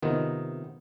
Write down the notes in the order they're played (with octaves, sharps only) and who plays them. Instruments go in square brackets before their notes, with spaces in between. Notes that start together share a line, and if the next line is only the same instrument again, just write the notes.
[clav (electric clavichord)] C3 B3 F4 [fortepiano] D#3